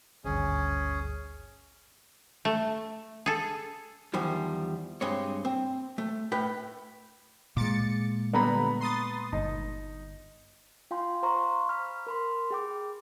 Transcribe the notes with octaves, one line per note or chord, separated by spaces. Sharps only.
G#1 D2 G2 C#4 G#4
A3
G#4 A4
E2 D#3 F3 G3
G2 G#3 C4 C#5
C4
A3
A2 B4 G5
A#2 G#3 D6 A6 C#7
D3 G3 B3 A#5 B5
C6 D#6 A6
G1 D#4
F4 F5 G5 G#5 C6
C5 F5 A#5 C6 C#6
B5 F6
A#4 B5 C6
G#4 G5 D6